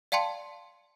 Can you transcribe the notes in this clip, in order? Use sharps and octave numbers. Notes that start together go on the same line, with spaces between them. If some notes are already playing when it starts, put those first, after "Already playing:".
D5 F5 G5 A5 C6 C#7